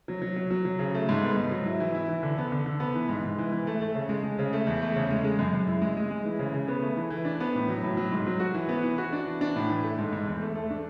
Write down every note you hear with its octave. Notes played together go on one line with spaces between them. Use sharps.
F#3
F#3
F#3
F#3
F#3
C#3
A3
G#2
B3
G#2
F#3
E4
E3
E4
E3
D3
B3
D3
D3
B3
E3
G#2
G#2
E3
E3
A3
A3
C#3
G#3
G#3
C#3
A3
E2
A3
C#3
G#3
G#3
F#2
F#2
E4
G#3
G#3
G#3
E3
C#3
C#3
B3
A3
E3
E3
D4
B3
A2
F#3
A2
F#3
G#2
F#3
F#4
E3
B3
E3
F#4
D4
E3
D4
A2
E3
A3
G#2
G#2
E2
A3
A3
D4